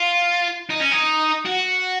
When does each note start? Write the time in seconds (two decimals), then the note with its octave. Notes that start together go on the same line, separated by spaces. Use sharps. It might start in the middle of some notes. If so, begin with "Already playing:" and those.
Already playing: F4
0.70 D#4
0.81 C#4
0.92 D#4
1.46 F#4